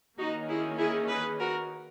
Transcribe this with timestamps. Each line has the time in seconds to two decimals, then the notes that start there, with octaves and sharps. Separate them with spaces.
0.18 D#3 A#3 C#4 D#4 F#4
0.48 E4 G#4
0.78 E4 G#4
1.09 G#4 B4
1.40 F#4 A#4